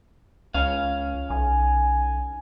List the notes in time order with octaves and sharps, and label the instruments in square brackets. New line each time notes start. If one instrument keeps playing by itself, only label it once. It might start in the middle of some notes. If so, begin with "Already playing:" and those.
[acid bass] C#2 [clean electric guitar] C#4 F5
[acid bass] B1 [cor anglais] G#5